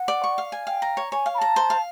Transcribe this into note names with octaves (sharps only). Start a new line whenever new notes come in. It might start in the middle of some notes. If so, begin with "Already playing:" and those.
Already playing: F#5
D5
C#6
F5
G#5
F5 G5
A#5
C#5
C#5 G#5
F5
B5
A5 A#5
C5
F5